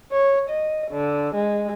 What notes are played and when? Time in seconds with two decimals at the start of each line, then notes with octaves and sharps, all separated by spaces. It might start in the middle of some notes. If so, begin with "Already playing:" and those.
0.12 C#5
0.50 D#5
0.91 D3
1.35 G#3